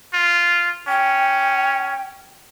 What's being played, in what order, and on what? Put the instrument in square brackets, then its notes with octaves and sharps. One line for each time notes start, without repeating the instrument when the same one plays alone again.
[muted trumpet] F4
[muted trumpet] C#4 [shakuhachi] G5